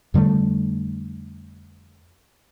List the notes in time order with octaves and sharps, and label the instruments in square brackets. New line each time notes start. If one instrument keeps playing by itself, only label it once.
[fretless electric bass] F2 D3 G3 A3